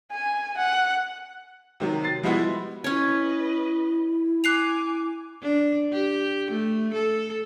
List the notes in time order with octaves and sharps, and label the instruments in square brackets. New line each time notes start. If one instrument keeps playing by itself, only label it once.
[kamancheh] G#5
F#5
[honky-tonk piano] C3 D#3 F#3
A6 C7
F3 G3 G#3 B3 E4 F#4
[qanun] C#4 C#5 [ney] E4 [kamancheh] B4 D#5
[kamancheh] G#5 D6 [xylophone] F#6 C7 F7
[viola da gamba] D4
G4
A3
A4